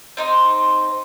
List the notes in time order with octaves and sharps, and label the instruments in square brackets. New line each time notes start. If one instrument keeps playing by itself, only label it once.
[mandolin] C4 D#4 C5